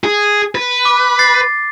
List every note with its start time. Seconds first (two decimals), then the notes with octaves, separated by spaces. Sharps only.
0.04 G#4
0.55 B4
0.85 D6
1.19 A6 C7